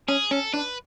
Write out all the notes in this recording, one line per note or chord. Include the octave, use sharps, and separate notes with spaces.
C#4 G#4
C#4 A4
D4 B4